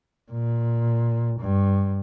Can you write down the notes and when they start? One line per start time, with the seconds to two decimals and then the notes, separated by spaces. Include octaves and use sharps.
0.32 A#2
1.40 G2